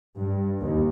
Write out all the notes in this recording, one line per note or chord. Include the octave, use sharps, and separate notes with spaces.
G2
D#2